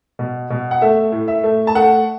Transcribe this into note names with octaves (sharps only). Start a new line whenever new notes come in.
B2
B2
F#5
A3 E5
A2
E5
A3
A5
A3 F#5